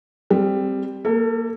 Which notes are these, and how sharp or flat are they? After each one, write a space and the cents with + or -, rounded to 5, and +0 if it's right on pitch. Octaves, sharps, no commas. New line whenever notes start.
G3 +5 C4 +0
A#3 -5 A4 +30